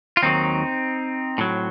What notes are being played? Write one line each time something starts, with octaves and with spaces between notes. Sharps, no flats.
F4
D#2 D#3 F#3 C4 D#4
A2 F#3